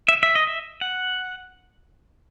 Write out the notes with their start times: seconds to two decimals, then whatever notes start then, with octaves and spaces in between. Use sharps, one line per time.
0.08 E5
0.23 E5
0.35 D#5
0.47 E5
0.81 F#5